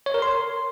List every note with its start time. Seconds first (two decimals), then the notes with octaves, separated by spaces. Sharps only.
0.06 C#5
0.14 A#4
0.22 C6